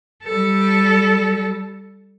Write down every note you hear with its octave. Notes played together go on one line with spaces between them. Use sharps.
G3 A4